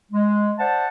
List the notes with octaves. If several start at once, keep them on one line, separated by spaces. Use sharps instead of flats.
G#3
C5 D5 E5 F#5 A5